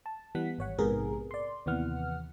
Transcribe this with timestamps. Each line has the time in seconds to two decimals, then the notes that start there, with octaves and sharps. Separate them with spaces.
0.06 A5
0.35 E3 G3 B3 F#5 B6
0.58 G#1 C#5 F#5
0.79 A#1 G#2 C3 B3 G#4 A#4
1.31 D5 C6
1.66 D#2 C3 E3 B3 F#5 F6